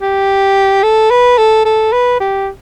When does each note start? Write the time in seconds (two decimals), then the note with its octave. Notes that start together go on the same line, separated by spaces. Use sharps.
0.01 G4
0.83 A4
1.11 B4
1.38 A4
1.65 A4
1.93 B4
2.20 G4